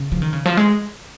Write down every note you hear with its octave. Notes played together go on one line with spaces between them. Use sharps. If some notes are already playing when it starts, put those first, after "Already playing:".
Already playing: C#3
F3
D#3
C#3
F3
G#3